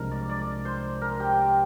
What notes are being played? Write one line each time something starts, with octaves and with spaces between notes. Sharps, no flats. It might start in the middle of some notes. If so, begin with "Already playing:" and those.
Already playing: C2 C3 F3 G#3 D4 A#4
D5
D5
C5
A#4
G4